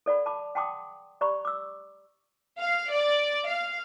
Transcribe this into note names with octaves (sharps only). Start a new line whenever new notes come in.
A4 D5 F#5 B5
A5 B5 D6
F#5 G5 A5 C6 D6 D#6
G4 D5 A#5 B5 C#6
D6 E6
F5
D5
F5